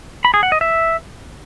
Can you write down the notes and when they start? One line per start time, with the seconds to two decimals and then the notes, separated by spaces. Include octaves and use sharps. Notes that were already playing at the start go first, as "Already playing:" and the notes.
0.25 B5
0.34 G#4
0.43 F#5
0.52 D#5
0.61 E5